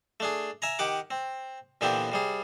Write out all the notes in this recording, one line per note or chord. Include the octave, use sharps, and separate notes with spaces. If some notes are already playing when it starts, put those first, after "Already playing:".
A3 D4 G#4
E5 G#5 A#5
D#3 G4 F#5 D6
C4
A#2 D3 E3 B3 C4 G4
C3 G3 G#4